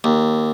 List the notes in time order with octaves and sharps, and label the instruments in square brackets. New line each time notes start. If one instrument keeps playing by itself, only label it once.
[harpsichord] D#2